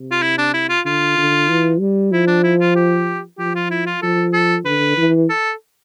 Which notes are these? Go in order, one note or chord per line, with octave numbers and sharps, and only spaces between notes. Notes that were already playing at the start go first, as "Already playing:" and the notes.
Already playing: C3
F4
E4
D4
E4
F4
D3 F4
D3
E3
G3
F3 E4
D4
E4
F4
G4
F3 G4
F4
E4
F4
F3 A4
A4
D3 B4
E3
A4